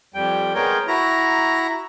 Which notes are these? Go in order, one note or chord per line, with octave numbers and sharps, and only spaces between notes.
F2 G3 G5
G#3 B3 A#4 C#5 G5
E4 F#4 A#5